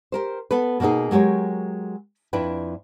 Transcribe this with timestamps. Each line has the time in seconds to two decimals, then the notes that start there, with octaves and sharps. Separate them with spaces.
0.12 G4 A#4 C5
0.51 B3 A4 B4
0.80 B2 A#3 B3 D#4 G#4
1.11 F#3 G#3 G4 A#4 C#5
2.33 F2 D4 E4 B4 G5